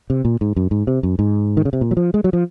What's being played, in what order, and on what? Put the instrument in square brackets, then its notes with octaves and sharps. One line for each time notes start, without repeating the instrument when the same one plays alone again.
[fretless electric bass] C3
A#2
G#2
F#2
G#2
C3
F#2
G#2
D#3
C#3
C3
A#2
F#3
F3
G#3
F#3
F3